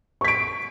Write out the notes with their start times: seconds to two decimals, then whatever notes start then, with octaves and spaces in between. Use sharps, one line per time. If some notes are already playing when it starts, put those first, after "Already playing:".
0.21 C#6
0.25 B6
0.28 D7